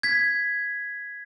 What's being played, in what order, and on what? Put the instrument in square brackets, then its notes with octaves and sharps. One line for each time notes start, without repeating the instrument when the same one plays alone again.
[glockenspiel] G#6 B6